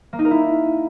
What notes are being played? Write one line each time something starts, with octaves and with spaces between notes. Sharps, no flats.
A#3
D#4
A#4
E4